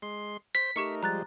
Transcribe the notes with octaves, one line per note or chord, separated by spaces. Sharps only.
G#3 C6
C5 B6
A3 D#4 G4 A#4 C#6 C#7
F3 G3 G#3 A#5 F#6 A6